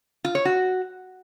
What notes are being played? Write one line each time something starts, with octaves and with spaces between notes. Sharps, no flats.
F4
C#5
F#4